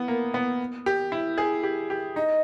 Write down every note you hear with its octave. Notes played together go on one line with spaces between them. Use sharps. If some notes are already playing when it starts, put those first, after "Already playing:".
Already playing: B3 E4
A#3
B3
G4
E4
G#4
G4
G4
D#4 D#5